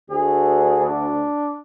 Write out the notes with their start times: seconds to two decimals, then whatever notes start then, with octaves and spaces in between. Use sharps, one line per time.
0.10 D2 G#4
0.87 D4